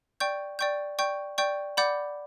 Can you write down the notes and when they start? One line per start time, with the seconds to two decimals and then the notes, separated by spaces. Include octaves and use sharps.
0.20 D5 G5 C#6 G6
0.59 D5 G5 C#6 G6
0.99 D5 G5 C#6 G6
1.38 D5 G5 C#6 G6
1.77 D5 F#5 B5 D6 G6